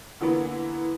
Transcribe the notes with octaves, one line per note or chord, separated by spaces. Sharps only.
D3 E3 A#3 B3